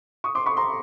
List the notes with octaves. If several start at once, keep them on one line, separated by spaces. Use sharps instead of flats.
C#6 D#6
C6 D6
B5 C#6
A#5 C6